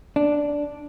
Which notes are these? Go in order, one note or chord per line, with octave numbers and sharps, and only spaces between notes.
D4